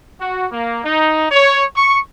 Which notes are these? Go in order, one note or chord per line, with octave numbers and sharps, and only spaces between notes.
F#4
A#3
D#4
C#5
C#6